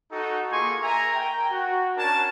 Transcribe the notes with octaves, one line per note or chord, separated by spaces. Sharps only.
D#4 F#4 A4
A#3 F4 G#4 G#5 C6 C#6
A#4 E5 G#5 A#5
G5
F#4
C#4 D4 A#4 G#5 A5